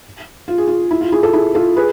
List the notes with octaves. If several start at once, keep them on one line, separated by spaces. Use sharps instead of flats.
F4
G#4
F4
E4
F4
E4 G#4
F4 A4
E4 G#4
F4 A4
G#4 B4